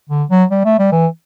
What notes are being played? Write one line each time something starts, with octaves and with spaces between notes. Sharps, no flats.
D3
F#3
G3
A3
G3
E3